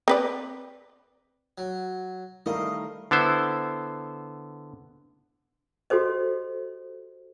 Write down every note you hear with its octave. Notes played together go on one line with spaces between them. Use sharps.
C4 B4 D5
F#3
D#3 G3 A3 E4 A#4 D#5 F5
D3 B3 E4 C5
F#4 G4 A4 C5 D#5